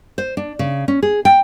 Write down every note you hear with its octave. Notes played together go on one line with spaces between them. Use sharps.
C5
D4
C#3
C#4
G#4
G5